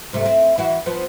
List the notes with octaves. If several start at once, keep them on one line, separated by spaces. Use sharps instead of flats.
G#2 C3 A3
C4 E4
E3 E4 F#4
F3 B3